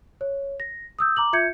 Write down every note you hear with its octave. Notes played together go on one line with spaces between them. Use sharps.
C#5
A#6
D#6 E6 G6
A#5 D6 F#7
F4 E5 G6 G#6 C#7